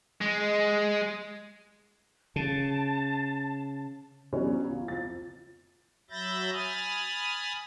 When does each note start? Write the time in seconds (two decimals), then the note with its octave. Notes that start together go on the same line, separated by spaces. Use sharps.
0.21 G#3
2.36 C#3 A5
4.33 E3 F#3 G3 B3 C#4 D4
4.69 C#2
4.88 F2 A6
6.10 F#3 E5 B5 G6 A6 A#6
6.52 G#5 B5 D#6 F6 A6